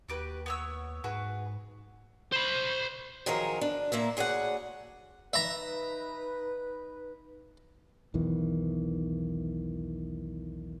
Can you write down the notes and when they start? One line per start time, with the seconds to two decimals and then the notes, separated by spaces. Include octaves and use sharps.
0.09 D#2 F#4 G4 B4
0.46 B3 C#5 E6
1.04 G#2 F#4 G#4 B4
2.32 C5 B5
3.26 D#3 F3 F#3 C#4 G#4 A#4
3.61 D4
3.92 A#2 A#3 E4 E5
4.17 D2 G#4 C#5 D5 F#5
5.33 D#4 B4 E5 A#5
8.14 B1 E2 D#3 E3